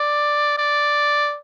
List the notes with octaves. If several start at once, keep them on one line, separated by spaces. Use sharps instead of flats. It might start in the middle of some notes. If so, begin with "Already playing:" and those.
Already playing: D5
D5